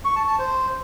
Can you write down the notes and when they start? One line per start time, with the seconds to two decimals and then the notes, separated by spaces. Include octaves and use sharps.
0.05 C#6
0.16 A5
0.27 A5
0.39 C5